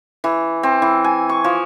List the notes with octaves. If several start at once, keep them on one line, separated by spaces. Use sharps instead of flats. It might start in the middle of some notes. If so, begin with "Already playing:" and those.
E3
C4
E3
G#5
C#6
F3